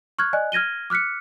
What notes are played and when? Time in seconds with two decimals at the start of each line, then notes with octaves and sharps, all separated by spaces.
0.19 C#6 F6 F#6 G#6
0.33 D5 D#5 G#5 F#6
0.52 F6 G#6 A#6 D#7 G7
0.90 D6 F6 F#6 B6 C#7